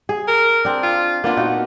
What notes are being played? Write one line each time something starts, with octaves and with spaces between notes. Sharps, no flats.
G#4
A#4
C4 D4
F4
A#3 B3 D4 F4
A#2 D#4 F#4